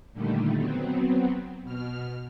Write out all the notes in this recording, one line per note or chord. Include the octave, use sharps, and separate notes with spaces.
A#2 D3 D#3 G3 A3
F#3 B3 C4
B2 F6